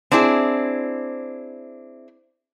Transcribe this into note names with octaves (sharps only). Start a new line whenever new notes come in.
C4 D4 E4 G#4